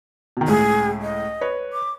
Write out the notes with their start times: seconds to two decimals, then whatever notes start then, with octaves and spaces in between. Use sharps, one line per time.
0.37 B2 D#3
0.48 C#2 A2 G#4
1.02 D#5
1.41 B4 C#5
1.73 D6